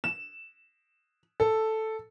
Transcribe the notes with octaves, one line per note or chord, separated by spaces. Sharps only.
E7
A4